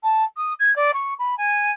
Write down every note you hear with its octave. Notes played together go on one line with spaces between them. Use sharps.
A5
D#6
G#6
D5
C#6
B5
G#5